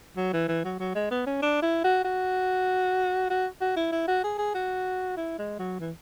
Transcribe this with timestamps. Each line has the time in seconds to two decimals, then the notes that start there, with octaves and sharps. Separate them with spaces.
0.17 F#3
0.33 E3
0.48 E3
0.65 F#3
0.80 F#3
0.95 G#3
1.11 B3
1.27 C#4
1.42 D4
1.62 E4
1.84 F#4
2.05 F#4
3.30 F#4
3.61 F#4
3.76 E4
3.92 E4
4.08 F#4
4.24 G#4
4.38 G#4
4.55 F#4
5.17 E4
5.38 G#3
5.59 F#3
5.80 E3